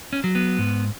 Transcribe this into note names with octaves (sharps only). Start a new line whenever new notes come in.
C#4
F#3
B3
G#2